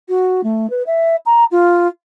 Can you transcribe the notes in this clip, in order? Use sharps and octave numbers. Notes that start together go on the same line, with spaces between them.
F#4
A3
B4
E5
A#5
F4